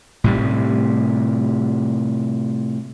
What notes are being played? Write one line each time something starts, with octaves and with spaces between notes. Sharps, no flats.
A2 C3 G3